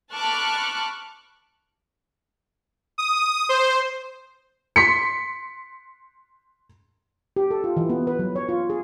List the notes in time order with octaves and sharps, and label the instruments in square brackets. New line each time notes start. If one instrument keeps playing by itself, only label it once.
[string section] A5 B5 C#6 D6 F6 F#6
[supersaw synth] D#6
C5
[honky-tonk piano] C6 B6 C#7
[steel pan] G4
A4
F4
E3
B3
B4
F#3
C#5
F4
G#4